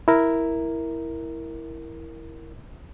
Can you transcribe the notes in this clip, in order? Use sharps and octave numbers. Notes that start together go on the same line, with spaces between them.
E4 A#4